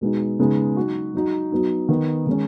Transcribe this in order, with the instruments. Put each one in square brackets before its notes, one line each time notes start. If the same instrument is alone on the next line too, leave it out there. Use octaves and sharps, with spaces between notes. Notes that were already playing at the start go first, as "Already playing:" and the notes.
[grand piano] B2 G#3 B3 D#4
C#3 G#3 B3 D#4
F#3 D#4 F#4
F#3 D#4 F#4
F#3 B3 D#4
D#3 B3 D#4
D#3 G#3 C#4